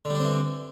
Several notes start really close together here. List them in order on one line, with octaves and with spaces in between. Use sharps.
D3 G3 D4 C4 E3